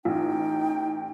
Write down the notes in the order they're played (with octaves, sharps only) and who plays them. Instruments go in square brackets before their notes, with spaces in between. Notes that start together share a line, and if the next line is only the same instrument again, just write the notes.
[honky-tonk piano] A1 [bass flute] D#4 [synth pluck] F4 [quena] G5